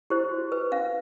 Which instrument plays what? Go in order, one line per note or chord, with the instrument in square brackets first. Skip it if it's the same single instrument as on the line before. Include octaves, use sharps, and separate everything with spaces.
[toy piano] E4 G4 C5
F#4
B4
C#4 F5